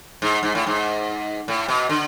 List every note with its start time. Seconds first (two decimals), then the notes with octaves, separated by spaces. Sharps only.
0.22 G#2
0.43 G#2
0.55 A2
0.67 G#2
1.48 A2
1.68 B2
1.89 D3